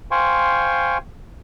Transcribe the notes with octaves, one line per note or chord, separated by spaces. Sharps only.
C5 F5 G5 G#5 C6 C#6